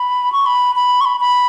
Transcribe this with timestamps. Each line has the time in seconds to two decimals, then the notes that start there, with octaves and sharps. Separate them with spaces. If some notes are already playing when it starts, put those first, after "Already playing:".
Already playing: B5
0.33 C#6
0.46 B5
0.76 B5
1.01 C#6
1.05 B5
1.20 B5